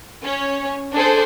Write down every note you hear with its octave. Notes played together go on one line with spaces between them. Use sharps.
C#4 C#5
D4 G#4 A4 C5